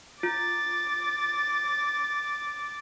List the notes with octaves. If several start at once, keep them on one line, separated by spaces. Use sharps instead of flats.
F4 D6 A6